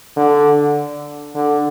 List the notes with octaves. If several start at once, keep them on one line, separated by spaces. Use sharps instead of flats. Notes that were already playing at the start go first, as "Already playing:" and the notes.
D3
D3